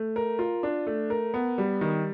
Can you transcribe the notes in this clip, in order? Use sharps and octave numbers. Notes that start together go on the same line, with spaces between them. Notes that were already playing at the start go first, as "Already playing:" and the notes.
Already playing: A3
A#4
F4
D4
A3
A#4
B3
G3
D#3